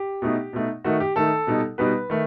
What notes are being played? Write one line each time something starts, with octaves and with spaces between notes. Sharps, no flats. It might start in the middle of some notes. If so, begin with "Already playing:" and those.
Already playing: G4
B2 A3 D#4
B2 A3 D#4
D#3 A3 D#4 F#4
G4
D#3 A3 D#4 A4
B2 G3 D#4
B2 G3 D#4 B4
D#3 A3